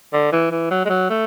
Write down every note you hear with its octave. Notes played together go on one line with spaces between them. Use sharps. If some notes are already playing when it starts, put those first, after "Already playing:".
D3
E3
E3
F#3
G#3
F#3
A3